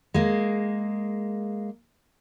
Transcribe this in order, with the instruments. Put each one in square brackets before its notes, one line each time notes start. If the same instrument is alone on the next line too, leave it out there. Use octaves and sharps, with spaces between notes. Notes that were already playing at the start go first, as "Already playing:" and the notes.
[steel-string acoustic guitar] G#3 A#3